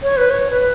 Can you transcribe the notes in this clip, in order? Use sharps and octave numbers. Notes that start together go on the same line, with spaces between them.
C#5
B4
C#5
B4